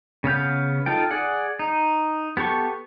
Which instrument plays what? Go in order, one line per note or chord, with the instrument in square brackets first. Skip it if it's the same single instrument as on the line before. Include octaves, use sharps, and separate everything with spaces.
[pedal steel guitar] C#3 B3 F5 G6
D#4 F4 A4 G5
G#4 D5 F#5
D#4
B3 G4 A4 C#6